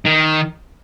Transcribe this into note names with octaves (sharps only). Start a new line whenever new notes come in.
D#3